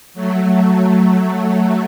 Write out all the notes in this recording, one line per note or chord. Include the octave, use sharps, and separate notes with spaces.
F#3 A3